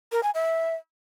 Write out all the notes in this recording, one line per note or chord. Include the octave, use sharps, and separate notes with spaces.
A#4
G#5
E5